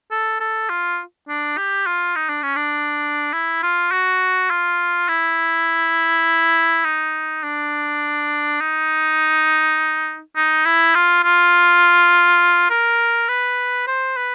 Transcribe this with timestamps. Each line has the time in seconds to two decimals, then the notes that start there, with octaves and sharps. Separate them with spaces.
0.11 A4
0.40 A4
0.69 F4
1.28 D4
1.57 G4
1.86 F4
2.16 D#4
2.29 D4
2.43 C#4
2.56 D4
3.33 E4
3.63 F4
3.91 F#4
4.50 F4
5.09 E4
6.84 D#4
7.43 D4
8.60 D#4
10.36 D#4
10.65 E4
10.95 F4
11.24 F4
12.70 A#4
13.28 B4
13.87 C5
14.17 B4